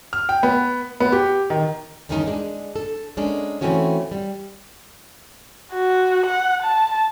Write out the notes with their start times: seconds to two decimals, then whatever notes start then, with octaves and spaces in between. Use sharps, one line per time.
0.13 F6
0.29 G5
0.43 B3
1.00 B3
1.12 G4
1.50 D#3
2.09 E2 G2 D#3 C#4 D#4
2.27 G#3 D4
2.76 A4
3.17 G#3 A#3 C#4 D4
3.61 E3 A3 C4 C#4 F#4 C#5
4.12 G3
5.72 F#4
6.26 F#5
6.62 A5